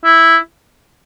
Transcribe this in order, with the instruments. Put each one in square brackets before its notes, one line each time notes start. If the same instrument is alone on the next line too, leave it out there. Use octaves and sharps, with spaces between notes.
[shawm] E4